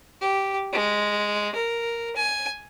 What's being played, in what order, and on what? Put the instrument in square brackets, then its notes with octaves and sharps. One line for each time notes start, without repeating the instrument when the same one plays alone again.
[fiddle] G4
G#3
A#4
G#5